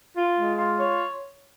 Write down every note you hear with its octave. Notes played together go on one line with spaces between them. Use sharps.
F4
G#3
F4
C#5